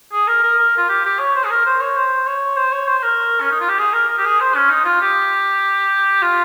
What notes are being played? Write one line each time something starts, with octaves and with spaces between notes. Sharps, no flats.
G#4
A#4
A#4
A#4
F4
G4
G4
C#5
C5
G#4
A#4
C5
C#5
C5
C#5
C5
C#5
C5
C5
A#4
C#4
D#4
F4
G4
G#4
A#4
A#4
G4
G#4
C5
C#4
D#4
F4
G4
F4